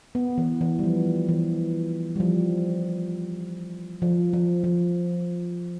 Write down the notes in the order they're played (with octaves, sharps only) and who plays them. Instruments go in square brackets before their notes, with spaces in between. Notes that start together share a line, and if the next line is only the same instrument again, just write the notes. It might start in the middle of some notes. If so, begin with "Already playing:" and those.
[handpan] B3
E3
E3
G3
F3
E3
G3
F3
F3
F3
F3